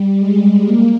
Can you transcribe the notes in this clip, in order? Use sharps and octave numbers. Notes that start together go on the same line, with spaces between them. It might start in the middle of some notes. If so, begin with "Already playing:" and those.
Already playing: G3
G#3
A#3